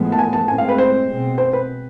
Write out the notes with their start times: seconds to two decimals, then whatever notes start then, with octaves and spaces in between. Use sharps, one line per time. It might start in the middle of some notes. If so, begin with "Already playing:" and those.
Already playing: A2 F3 G#3 B3
0.12 A5
0.19 G#5
0.33 A5
0.48 A2 G#3 C4 G#5
0.58 F5
0.69 B4
0.78 C5
1.08 B2 G#3 C4
1.38 C5
1.53 B4